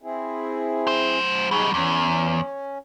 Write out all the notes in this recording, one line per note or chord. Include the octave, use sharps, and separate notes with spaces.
C4 E4 G#4
F#3 C5
F#3 G3 D#4 G#4
E2 C#4